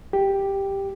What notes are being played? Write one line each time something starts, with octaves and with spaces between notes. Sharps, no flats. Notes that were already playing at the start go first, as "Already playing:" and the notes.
G4